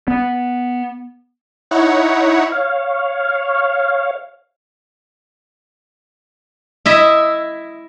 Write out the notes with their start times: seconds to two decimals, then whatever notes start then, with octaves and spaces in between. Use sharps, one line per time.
0.08 B3
1.71 D#4 E4 C#5 F#5
2.52 C#5 F5
6.86 E4 D#5 E5